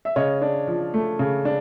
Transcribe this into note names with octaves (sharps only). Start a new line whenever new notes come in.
E5
C#3 C#5 D#5
D4
F3
A3
C#3
D4